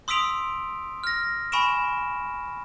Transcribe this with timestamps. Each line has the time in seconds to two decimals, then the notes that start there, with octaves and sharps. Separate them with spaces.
0.08 C6 D#6 E6 B6 D7 F7
1.04 F6 A#6
1.52 G#5 B5 C#6 D7 E7